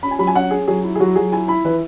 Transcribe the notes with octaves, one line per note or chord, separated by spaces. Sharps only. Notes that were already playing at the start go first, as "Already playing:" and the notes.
C#4 B5
G#5
F#3 B5
G#5
C#4 F#5
C#4 G#4
F#3 G#4
E4
G#4
F#3 F#4
F#3 G#4
E4 G#5
E4 B5
E3 B4